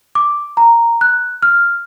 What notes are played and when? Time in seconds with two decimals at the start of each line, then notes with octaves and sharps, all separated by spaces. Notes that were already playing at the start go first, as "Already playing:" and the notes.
0.15 D6
0.57 A#5
1.01 F#6
1.42 F6